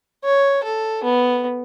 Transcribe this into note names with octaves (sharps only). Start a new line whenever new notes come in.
C#5
A4
B3